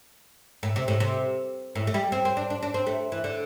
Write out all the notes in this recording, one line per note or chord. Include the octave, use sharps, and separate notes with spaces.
A2
C3
A2
C3
A2
A3
G3
C4
C4
D4
D4
D4
C4
A3
E3
D3